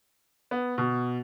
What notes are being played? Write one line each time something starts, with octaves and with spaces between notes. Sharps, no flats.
B3
B2